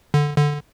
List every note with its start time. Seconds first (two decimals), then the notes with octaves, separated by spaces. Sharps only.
0.14 D3
0.37 D3